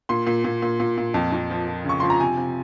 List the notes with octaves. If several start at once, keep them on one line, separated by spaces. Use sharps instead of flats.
A#2 C6
A#2
A#2
A#2
A#2
A#2
F2
F2
F3
F3
C#3 C#6
F3 C6
A#5
C3 G#5
C3